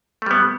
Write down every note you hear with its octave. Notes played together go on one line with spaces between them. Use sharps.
G3 A3 B3